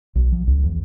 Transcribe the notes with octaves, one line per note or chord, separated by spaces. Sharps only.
B1
F3
C#2
E2